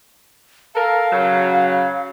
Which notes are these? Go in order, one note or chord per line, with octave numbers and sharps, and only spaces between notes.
A4 A#4 F5
C#3 F#3